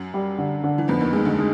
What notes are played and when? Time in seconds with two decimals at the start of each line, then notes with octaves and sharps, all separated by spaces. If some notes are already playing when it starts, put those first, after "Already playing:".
Already playing: F#2 F#3
0.14 G3
0.38 D3
0.64 D3
0.78 E3
0.88 F2 F3 B3
1.01 D#2 D#3
1.13 D#2 D#3 G#3
1.25 D2 D3
1.39 G#3